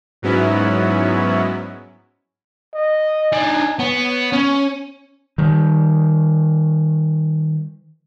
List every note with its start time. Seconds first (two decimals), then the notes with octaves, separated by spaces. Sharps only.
0.22 G#2 F#3 B3 C#4 E4
2.74 D#5
3.32 D4 D#4 G#5
3.79 B3 C#5
4.33 C#4
5.38 D#3 G3